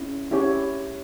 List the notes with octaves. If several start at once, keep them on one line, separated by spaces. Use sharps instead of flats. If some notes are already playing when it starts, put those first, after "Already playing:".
Already playing: C#4 E4
C#4 E4 G4 C#5